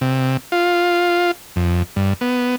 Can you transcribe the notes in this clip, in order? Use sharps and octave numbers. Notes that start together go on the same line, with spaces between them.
C3
F4
F2
G2
B3